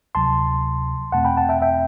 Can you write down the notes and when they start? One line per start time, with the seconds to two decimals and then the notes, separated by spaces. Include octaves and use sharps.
0.15 D2 C3 F#3 A5 C6
1.12 E2 B2 A3 C4 F#5 A5
1.25 G5 B5
1.37 F#5 A5
1.49 E5 G5
1.62 E5 G5